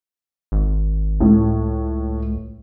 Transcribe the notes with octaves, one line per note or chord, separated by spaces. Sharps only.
G#1
C#2 A2